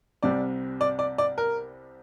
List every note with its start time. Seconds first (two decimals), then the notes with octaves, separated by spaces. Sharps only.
0.23 C2 C3 G3 C4 D5
0.81 D5
0.99 D5
1.18 D5
1.38 A#4